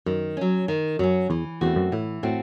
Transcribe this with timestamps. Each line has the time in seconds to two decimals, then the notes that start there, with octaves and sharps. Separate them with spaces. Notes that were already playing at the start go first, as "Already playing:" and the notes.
0.06 F#2 D#3
0.37 F#3 C#4
0.68 D#3
0.99 F#2 F#3 C#4
1.30 E2 E3
1.61 E2 A3 C4 F#4
1.76 F#2
1.92 A2 E3
2.23 A2 A3 C4 F#4